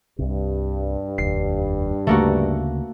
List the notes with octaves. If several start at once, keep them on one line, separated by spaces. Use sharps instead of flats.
C2 G2 C3
F1 D#2 C7
D2 C#3 A3 A#3 F#4